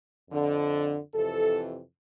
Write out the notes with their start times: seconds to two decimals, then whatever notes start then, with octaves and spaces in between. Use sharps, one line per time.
0.31 F2 D3
1.14 F2 C3 E3 A4